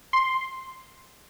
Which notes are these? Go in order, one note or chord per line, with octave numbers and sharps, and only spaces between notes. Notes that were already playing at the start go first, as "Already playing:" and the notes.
C6